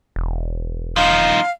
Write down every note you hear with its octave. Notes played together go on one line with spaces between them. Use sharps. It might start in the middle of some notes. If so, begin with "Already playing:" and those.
E1
F3 D#4 F5